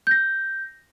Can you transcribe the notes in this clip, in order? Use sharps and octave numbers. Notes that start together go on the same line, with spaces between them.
G6 A#6